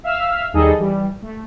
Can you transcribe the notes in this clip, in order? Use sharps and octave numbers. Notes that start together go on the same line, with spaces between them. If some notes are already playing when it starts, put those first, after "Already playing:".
E5 F5 E6 F6
D#2 G3 D#4 G#4 A4 D#5
E3 G3
A3